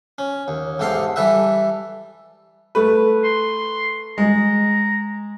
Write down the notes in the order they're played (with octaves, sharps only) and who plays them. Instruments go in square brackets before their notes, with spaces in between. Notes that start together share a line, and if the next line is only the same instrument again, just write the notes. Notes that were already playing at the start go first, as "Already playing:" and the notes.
[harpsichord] C#4
D#2
E2 G#2 G4 A4 F5 C6
E3 G3 A4 B4 E5
[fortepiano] A3 B4
[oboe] C6
[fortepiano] G#3 [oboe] A#5